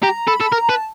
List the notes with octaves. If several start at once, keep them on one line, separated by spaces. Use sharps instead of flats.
G4 A#5
A4 B5
A4
A#4 A#5
B4 A5